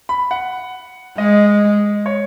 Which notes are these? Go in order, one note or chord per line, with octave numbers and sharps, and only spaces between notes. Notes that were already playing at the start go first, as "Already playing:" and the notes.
B5
F#5
G#3 D#5
C#5